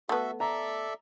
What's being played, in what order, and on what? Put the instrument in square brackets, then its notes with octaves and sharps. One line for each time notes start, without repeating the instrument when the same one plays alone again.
[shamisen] A3 B3 [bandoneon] F#4 A4 E5
[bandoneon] A4 D5 E5 [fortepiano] A#5